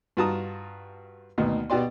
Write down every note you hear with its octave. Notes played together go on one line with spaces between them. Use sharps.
G2 F4 F#4 A5 A#5 D#6
D2 B2 D#3 A#3
B2 F#4 G4 D5 C6